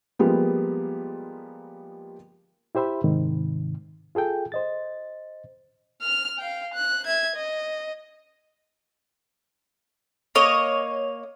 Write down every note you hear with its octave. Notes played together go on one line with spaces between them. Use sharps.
F3 G3 G#3 A#3 B3
E4 G4 C5 E5 B5
G#2 C3 D#3
F4 G#4 A4 G5
C5 D#5 A6
F6 F7
F5 G5
F#6
E5 G#6
D#5
A#3 C#5 D#5